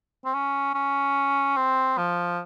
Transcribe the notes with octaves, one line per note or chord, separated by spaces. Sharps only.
C4
C#4
C#4
C4
F3